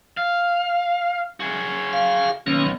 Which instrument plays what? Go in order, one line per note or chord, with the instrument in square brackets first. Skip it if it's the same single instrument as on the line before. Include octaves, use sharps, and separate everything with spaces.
[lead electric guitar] F5
F#4 G#4
[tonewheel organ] F5
[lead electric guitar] B1 [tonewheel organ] D#3 A#3 C#4